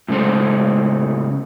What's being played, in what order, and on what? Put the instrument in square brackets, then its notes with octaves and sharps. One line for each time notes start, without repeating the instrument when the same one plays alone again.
[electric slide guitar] A2 C#3 G#3 A4 C5